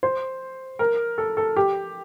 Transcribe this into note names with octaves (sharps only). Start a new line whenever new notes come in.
C5
A#4
A4
A4
G4